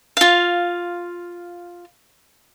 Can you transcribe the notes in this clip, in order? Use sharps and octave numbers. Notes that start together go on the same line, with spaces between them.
F4 F5